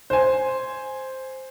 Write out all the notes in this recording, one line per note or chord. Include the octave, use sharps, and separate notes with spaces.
C5 G#5